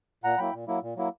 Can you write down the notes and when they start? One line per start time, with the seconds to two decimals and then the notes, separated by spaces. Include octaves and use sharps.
0.24 A#2 F#5 A#5
0.38 F#3 A#3 E4 G5 B5
0.53 A#2
0.67 F#3 A#3 E4
0.82 A#2
0.97 F#3 A#3 E4